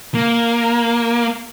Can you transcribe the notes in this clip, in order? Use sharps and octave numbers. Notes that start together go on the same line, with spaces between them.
A#3